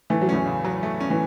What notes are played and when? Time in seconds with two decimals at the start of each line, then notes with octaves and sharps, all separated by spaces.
0.10 E3 A3
0.21 F#3
0.29 E2 E3 C#4
0.46 C#3
0.64 F#3
0.83 A3
1.00 C#4
1.10 E3